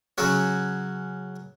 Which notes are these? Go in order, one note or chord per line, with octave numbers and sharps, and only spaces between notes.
C#3 F#3 C#4 F#4